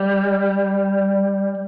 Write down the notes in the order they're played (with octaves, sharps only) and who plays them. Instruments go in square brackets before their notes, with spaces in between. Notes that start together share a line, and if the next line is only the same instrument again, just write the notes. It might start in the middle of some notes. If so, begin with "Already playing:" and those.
Already playing: [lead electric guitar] G3